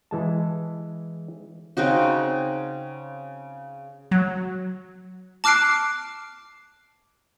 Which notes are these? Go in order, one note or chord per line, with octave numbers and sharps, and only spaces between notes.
E3 G#3 A5
C#3 C4 D#4 F#4
F#3
A5 D6 F6 F#6 C7 D7